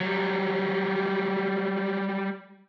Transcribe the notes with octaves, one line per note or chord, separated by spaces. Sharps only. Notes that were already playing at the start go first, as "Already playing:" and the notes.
F#3 G3